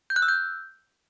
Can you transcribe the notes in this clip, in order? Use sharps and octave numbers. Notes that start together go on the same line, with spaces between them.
G6
F#6
E6
G6